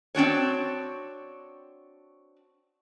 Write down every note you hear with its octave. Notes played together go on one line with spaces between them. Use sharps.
C4 D4 F#4 C#5